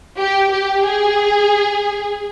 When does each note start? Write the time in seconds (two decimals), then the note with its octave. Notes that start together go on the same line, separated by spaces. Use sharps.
0.18 G4
0.52 G4
0.86 G#4